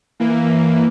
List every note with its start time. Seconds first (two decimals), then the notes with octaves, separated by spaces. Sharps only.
0.20 E3 A#3